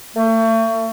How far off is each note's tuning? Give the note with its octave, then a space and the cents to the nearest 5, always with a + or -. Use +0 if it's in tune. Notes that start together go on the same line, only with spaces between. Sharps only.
A3 +35